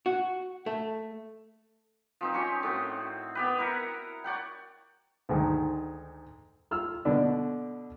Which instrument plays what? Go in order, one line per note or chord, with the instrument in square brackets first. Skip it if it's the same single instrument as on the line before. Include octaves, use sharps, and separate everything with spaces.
[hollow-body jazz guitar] F#4
A3
[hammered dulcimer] F3 C4 D#4
C#4 G4 G#5 C#6
A2 C4 F#4
B3 G4 B4
E4 A#4 F#5
C#5 D5 F#5 G5
[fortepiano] D2 G#2 D#3
F4 E6 F6
B2 D3 D4